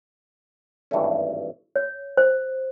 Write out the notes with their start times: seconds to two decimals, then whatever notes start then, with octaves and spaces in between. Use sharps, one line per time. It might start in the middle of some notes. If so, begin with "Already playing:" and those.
0.91 G#1 G2 E3 A3 C#4
1.76 C#5
2.17 C5